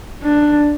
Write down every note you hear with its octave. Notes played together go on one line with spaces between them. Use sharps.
D4